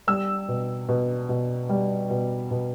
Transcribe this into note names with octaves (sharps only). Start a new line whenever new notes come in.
G3 E6
B2
B2
B2
G3
B2
B2